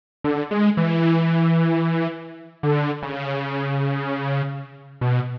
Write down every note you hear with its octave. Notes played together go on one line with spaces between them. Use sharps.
D3
G#3
E3
D3
C#3
B2